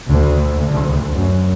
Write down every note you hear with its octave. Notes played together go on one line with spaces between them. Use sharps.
D2
D2
F#2